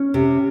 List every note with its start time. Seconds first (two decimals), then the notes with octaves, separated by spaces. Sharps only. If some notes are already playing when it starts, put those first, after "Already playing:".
Already playing: C#4
0.14 C3